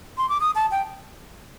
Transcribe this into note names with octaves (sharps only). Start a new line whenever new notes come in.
C6
D6
D#6
A5
G5